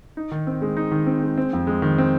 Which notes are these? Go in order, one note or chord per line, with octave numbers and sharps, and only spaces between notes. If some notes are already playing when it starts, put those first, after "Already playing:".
D#4
D#3
C4
G#3
D#4
D#3
C4
G#3
C4
F2
G#3
D#3
C4